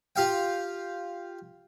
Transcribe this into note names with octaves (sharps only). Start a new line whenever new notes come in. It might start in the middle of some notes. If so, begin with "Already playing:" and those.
F4 G4 F5 G5